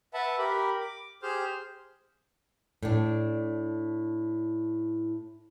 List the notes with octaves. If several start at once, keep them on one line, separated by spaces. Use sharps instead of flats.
B4 E5 F#5 A5 B5
G4 A#4 B5
D6
G4 G#4 C5 C6 F6 G6
A2 D4